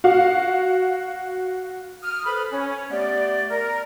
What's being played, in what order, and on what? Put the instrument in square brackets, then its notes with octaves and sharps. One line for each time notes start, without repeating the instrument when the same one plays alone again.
[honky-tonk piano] F#4 F5
[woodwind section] D#6 F6
A4 B4 C5 B5
C#4
A3 B3 G4 D5
A#4